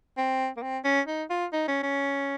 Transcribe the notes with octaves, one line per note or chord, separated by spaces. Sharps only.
C4
A#3
C4
C#4
D#4
F4
D#4
C#4
C#4